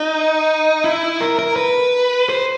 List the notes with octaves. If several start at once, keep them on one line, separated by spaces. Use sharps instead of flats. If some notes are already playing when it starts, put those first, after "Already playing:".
Already playing: D#4
E4
A#4
A#4
B4
C5